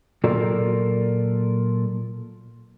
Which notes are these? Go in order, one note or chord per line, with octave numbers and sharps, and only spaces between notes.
A#2 F#3 F4 A4 A#4 D5